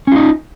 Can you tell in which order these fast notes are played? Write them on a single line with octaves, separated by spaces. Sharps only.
C#4 F4 D#4